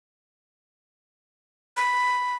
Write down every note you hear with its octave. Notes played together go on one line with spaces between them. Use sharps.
B5